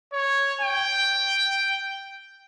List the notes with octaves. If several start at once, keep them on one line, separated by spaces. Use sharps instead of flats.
C#5
G5